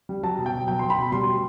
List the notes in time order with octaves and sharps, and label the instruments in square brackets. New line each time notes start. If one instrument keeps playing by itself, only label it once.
[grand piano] G3
F#3 A5
B2
G5
B2
F#3 G5
F#3 C6
B5
B2
G3 C6
G3